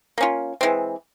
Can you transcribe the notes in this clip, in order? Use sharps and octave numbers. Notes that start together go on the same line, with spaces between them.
A#3 C#4 F4
E3 G#3 C4